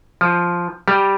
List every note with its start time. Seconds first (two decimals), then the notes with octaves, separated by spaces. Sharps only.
0.21 F3
0.88 G3